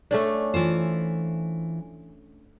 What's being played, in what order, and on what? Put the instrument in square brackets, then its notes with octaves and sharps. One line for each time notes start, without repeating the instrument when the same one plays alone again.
[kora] A3 C#4 D4
[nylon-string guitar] E3 F4 C5